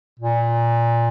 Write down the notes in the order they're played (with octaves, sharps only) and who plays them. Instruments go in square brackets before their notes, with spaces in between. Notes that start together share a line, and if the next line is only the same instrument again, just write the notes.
[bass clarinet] A#2